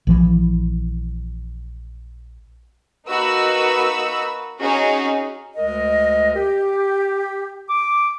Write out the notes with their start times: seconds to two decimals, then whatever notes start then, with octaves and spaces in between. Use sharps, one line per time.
0.07 A#1 E3 F3
3.08 A#3 D#4 F#4 B4 E6
4.61 C#4 D#4 F#4 G#4
5.57 D2 G#3 A#4 D#5
6.35 G4
7.69 D6